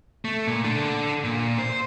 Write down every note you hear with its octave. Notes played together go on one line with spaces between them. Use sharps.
A3
A#2
D4 A4
A#2
C5